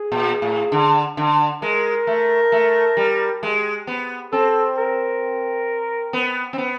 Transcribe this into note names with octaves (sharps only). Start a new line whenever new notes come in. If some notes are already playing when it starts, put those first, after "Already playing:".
Already playing: G#4
A#2
A2
D3
D3
G#3 A#4
A3
A3
G3
G#3
B3
C4 A4
A#4
B3
C4
B3